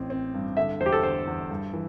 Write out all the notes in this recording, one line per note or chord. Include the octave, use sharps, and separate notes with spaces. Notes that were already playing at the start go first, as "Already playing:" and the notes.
Already playing: A1 C4
C4
G2
D3 E5
E2 C5
G4
A4
D3 C5
E2
G2
E3